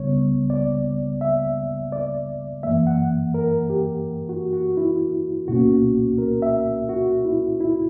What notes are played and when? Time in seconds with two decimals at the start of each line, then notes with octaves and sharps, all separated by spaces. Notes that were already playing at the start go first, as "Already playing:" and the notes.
Already playing: C#2 C#3 G3 B3 C#5
0.50 D5
1.21 E5
1.92 D5
2.63 F#2 E3 A#3 E5
2.87 F#5
3.34 A#4
3.70 G4
4.29 F#4
4.53 F#4
4.77 E4
5.48 C#2 B2 A#3 C#4 F#4
6.18 A#4
6.42 E5
6.89 F#4
7.25 E4
7.60 E4